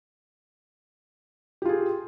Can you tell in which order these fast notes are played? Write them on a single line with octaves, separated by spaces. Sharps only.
G4 F4 G#4